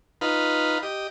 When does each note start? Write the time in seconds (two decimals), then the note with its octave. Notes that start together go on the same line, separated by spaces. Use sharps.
0.21 D#4 F4 B4
0.83 G4 D#5